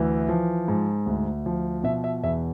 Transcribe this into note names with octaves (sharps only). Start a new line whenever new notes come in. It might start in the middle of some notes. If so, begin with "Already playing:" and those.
Already playing: D2 E3
F3
G#2
D2
F3
B2 E5
E5
E2 E5